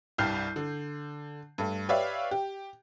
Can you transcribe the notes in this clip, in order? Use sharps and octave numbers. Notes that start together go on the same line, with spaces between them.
C2 G2 G3 F6 G6 C7
D3
G2 A3
G4 B4 C#5 D5 E5 F5
G4